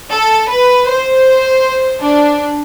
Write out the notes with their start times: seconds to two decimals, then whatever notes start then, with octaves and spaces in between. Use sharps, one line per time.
0.13 A4
0.50 B4
0.88 C5
2.02 D4